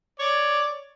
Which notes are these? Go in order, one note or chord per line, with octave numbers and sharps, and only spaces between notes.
C#5 D5